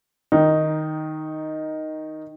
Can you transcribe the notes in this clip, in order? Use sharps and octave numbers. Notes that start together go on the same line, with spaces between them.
D#3 D#4